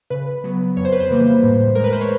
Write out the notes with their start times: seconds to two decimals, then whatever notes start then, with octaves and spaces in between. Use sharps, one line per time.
0.10 C#3 B4
0.44 F#3 B3
0.77 F2 C#5
0.85 C5
0.92 B4
1.00 C5
1.11 C#3 E3 G3 A#3
1.43 A2
1.75 E3 G#3 A#4
1.84 B4
1.93 C5
2.01 C#5